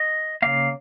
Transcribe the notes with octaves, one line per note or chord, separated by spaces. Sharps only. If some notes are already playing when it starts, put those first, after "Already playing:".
Already playing: D#5
C#3 F3 A#3 F5